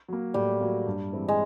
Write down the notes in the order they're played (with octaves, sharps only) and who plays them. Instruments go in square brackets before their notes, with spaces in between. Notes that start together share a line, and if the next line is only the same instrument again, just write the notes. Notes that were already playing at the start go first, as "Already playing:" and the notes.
[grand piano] F#3 A#3
[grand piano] A2 [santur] G3
[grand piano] F#3 A#3
G2
E3 G#3 C4 E4
[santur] G#3